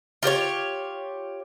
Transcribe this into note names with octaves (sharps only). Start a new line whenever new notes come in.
F4 G4 C5 C#5